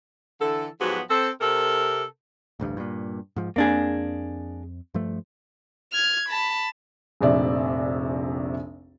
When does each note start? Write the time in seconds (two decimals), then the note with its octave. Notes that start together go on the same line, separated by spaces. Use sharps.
0.41 D3 E3 A4
0.80 G#2 F3 F#3 B3 F#4 G4
1.10 C4 A4
1.41 C3 A4 A#4
2.60 A1 D2 G2
2.77 G2 A#2
3.36 G#2 F3
3.56 F2 A#3 C4 D4 G#4
4.94 G2 F3 A3
5.93 F6 G#6
6.29 A5 B5
7.21 F1 A#1 C3 D5 E5